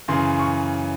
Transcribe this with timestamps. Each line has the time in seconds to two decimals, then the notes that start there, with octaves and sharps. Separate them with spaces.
0.08 F#2 C#3 E3 C6
0.39 C#6